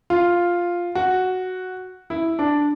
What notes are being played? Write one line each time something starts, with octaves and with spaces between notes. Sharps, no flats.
F4
F#4
E4
D4